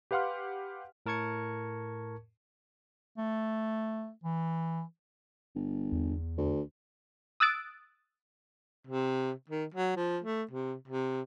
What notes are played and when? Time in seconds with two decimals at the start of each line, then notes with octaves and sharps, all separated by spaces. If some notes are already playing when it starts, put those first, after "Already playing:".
0.11 G4 B4 F5 F#5 C6 F6
1.06 A2 A#4 A5 C#6 G#6 C#7
3.18 A3
4.23 E3
5.55 G1
5.92 E2
6.38 D2
7.40 D#6 E6 F#6 A6 D7
8.87 C3
9.50 D#3
9.74 F#3
9.96 F3
10.24 A3
10.51 C3
10.88 C3